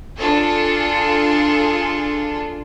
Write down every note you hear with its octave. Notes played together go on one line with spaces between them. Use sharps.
D4 F4 G#4 A4